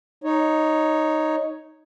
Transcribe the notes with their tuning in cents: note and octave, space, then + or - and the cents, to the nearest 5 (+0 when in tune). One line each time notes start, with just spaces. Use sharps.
D#4 +0 C#5 +0